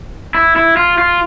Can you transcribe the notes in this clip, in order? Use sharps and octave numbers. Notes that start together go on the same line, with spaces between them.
E4
E4
F4
F4